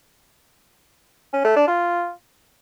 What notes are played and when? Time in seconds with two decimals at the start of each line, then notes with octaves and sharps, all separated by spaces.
1.33 C#4
1.44 A3
1.56 D4
1.67 F4